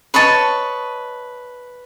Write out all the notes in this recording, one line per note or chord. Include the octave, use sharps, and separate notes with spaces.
B4 C#5 D#5 A5